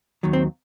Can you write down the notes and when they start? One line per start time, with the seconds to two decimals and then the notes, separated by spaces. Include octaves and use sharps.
0.23 D#2 D#3 F#3
0.33 C4